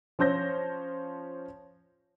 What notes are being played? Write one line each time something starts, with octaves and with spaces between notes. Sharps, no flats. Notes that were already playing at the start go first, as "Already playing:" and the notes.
F3 C#4 C5 G6 A#6